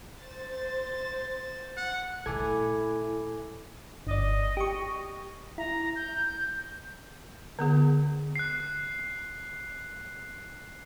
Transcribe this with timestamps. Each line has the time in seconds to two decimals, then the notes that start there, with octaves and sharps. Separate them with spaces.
0.24 C5 A6
1.77 F#5
2.26 A#2 A3 E4 A4 G#5 D6 G#6
4.07 G1 D5 D#5
4.57 G4 C#6
5.58 E4 A#5
5.96 G6
7.59 D3 B3 G#4
8.36 F#6 C7